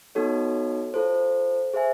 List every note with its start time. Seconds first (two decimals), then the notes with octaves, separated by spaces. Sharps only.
0.15 B3 D#4 F#4 A4 C#5
0.94 F4 A4 C5
1.74 G#4 C5 E5 G#5